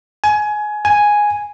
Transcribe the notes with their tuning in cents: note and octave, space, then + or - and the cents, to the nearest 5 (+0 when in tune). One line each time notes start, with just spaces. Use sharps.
G#5 +20
G#5 +0